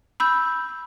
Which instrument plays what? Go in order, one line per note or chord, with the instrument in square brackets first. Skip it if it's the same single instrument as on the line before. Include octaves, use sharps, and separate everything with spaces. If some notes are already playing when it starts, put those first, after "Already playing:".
[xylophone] B5 E6 G6